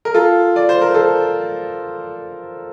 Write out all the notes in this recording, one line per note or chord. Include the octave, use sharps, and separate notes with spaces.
A#4
F4 A4
D5
C5
A#4
A4 C5